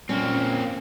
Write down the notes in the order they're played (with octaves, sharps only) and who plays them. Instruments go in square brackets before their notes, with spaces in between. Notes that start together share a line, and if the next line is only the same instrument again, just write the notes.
[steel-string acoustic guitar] A#2 C#4 [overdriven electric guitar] A#3 C4